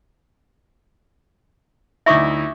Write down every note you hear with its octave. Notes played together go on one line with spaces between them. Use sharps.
D2 D#4 E4 E5 C#6 D6